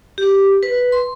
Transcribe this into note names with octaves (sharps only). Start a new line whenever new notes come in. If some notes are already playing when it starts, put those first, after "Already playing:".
G4
B4
C6